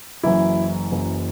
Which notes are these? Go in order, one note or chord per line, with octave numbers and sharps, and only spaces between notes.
F#1 F#2 E3 E4
F#1 F#2 E3